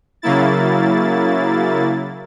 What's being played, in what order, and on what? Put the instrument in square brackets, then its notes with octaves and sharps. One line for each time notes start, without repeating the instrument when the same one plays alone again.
[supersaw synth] C#3 F#3 A#3 E4 A6